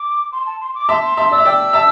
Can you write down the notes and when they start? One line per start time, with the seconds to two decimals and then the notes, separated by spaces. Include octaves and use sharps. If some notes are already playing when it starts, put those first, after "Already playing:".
Already playing: D6
0.32 C6
0.46 A5
0.61 C6
0.74 D6
0.89 E5 A5 C6
1.03 C6
1.17 E5 A5 C6
1.31 D5 E6
1.38 E5
1.45 D5 G5 E6
1.73 E5 A5